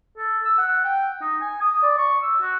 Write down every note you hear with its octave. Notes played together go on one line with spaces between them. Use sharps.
A4
E6
F#5
G5
D#4
G#5
D#6
D5
C#6
E6
F#4